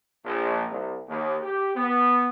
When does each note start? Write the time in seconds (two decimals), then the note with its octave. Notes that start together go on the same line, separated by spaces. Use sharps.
0.25 A#1
0.69 C2
1.08 D#2
1.42 G4
1.76 B3